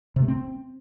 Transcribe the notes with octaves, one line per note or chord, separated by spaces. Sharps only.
C3
A3
C4